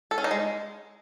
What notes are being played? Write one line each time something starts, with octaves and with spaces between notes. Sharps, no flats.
A4
C#4
D#4
G#3